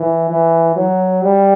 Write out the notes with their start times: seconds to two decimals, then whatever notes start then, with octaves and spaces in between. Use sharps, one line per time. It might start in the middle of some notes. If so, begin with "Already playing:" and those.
Already playing: E3
0.30 E3
0.76 F#3
1.23 G3